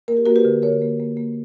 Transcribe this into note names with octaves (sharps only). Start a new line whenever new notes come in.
A#3 A#4
G4
A#3 F#4 A#4
G4 B4
D3
D3 A#4 C#5
A#3
A#3
A#3